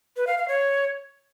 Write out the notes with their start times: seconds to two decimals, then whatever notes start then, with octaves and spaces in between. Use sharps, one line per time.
0.16 B4
0.27 F5
0.37 F5
0.48 C#5